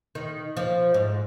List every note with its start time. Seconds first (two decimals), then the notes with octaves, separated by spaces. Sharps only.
0.15 D#3
0.57 F3
0.94 G#2